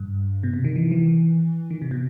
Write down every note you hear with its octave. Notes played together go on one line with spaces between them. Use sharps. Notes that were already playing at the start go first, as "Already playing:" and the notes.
Already playing: G2
B2
C3
D#3
E3
E3
D#3
C3
B2